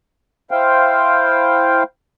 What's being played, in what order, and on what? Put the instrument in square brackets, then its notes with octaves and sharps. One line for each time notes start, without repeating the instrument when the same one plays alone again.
[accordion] E4 C5 F5 G5